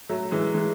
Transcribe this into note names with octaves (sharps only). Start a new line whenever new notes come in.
F#3 A3
E3 G#3
E3 G#3